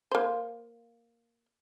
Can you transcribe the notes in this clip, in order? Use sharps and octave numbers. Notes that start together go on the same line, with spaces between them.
A#3 C5